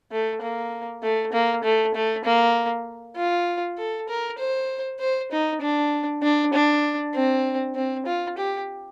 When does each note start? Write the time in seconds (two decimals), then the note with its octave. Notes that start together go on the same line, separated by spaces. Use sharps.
0.12 A3
0.41 A#3
1.03 A3
1.33 A#3
1.64 A3
1.95 A3
2.25 A#3
3.17 F4
3.78 A4
4.08 A#4
4.39 C5
5.00 C5
5.31 D#4
5.62 D4
6.23 D4
6.53 D4
7.14 C4
7.75 C4
8.06 F4
8.37 G4